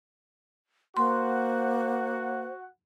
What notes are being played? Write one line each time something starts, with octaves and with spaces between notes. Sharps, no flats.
A#3 F#4 C5 F#5 C6